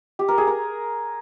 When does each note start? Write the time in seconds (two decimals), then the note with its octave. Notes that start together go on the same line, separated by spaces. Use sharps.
0.19 G4
0.28 A#4
0.38 G#4
0.47 A#4